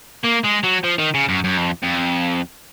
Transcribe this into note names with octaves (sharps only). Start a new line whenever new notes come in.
A#3
G#3
F#3
F3
D#3
C#3
F#2
F#2
F2
F2